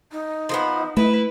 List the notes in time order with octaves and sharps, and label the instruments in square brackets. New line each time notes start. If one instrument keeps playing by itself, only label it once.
[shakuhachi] D#4
[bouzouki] F3 A#3 B3
[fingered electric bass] A3 [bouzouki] E4 [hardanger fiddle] B4